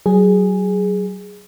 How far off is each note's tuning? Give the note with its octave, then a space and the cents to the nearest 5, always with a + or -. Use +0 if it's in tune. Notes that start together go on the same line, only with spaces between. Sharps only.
F#3 +25 G#4 +0